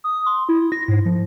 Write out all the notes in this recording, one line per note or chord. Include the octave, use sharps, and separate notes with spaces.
D#6
C6
E4
A#6
G#2
F3